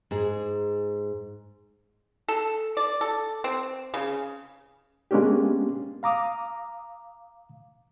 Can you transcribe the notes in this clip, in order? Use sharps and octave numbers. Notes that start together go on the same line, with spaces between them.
G#2 G#4
A4
D5
A4
C4
C#3
G#3 A#3 B3 C#4 D4 G4
F5 A#5 D6 D#6